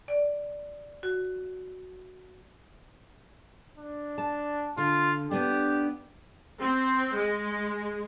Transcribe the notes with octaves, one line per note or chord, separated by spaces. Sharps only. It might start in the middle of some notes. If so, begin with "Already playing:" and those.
D5
F#4
D4
A5
D3 F4
B3 D4 G4
C4
G#3